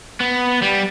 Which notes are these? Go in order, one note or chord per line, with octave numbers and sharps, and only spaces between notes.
B3
G3